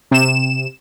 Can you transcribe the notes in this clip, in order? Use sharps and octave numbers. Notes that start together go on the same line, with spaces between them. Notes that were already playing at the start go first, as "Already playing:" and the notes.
C3 E7